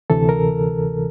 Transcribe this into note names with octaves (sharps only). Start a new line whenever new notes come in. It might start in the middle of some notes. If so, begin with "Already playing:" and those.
D2 C3 E3 A4
A#4